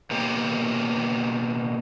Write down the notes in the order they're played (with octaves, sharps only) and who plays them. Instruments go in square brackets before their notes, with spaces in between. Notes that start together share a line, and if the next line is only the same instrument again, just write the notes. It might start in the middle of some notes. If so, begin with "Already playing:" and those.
[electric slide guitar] B2 A#3 G4